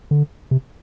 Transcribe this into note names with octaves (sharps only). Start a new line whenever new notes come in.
D3
C3